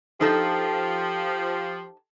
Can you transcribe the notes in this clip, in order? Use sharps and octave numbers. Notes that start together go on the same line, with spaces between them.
F3 D#4 G4 A4 C5